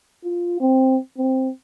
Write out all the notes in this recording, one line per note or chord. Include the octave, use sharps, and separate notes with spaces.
F4
C4
C4